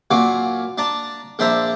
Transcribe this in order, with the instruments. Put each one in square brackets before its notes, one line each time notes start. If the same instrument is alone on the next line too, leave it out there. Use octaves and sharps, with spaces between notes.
[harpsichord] A#2 F#3 F#4 F5 G#5 D6
D4 D5 A5 A#5
A#1 D4 C5 E5 A5 A#5